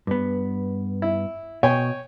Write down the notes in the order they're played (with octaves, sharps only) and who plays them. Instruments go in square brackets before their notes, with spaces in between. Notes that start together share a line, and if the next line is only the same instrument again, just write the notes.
[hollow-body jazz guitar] G2 B3
[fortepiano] E4
[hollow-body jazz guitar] B2 [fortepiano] C#5 G5 G#5